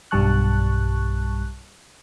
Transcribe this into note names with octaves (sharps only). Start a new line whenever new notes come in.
B1 G2 G3 A5 C#6 F#6